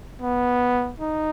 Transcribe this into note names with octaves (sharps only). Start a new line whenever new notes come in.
B3
D#4